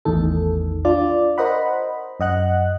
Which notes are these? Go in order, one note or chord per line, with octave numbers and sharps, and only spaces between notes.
A1 E2 A2 D#3 A4
D4 F4 D5
A#4 C5 D#5 F#5 B5
F#2 D#5 F#5 F#6